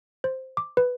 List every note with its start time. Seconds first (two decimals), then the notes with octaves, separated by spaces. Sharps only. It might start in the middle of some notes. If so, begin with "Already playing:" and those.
0.24 C5
0.57 D6
0.77 B4